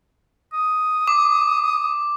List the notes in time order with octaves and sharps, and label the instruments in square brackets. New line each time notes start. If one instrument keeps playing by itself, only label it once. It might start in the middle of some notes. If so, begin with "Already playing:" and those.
[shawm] D#6
[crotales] D6